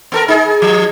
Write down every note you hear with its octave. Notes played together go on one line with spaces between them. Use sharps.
B3 A4 A#4
D#4 G#4
F3